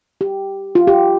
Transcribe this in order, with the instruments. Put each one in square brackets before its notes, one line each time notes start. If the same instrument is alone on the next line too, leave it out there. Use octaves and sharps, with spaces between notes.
[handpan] G4
F4
G4